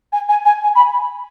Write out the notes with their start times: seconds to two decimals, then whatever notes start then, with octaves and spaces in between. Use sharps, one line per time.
0.13 G#5
0.29 G#5
0.46 G#5
0.63 G#5
0.75 B5